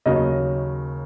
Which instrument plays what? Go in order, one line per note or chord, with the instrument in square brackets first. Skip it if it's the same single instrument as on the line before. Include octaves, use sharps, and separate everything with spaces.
[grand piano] D#2 C#3 F#3 D#5